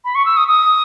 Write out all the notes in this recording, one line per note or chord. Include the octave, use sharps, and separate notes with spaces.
B5
C#6
E6
D#6
D#6